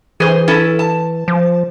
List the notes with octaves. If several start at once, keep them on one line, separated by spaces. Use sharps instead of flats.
E3 G#4 C5
C#4 E4 A4
A5
F3